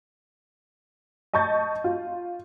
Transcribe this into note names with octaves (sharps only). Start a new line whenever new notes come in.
D#5 A5 C#6 G6 A6
F4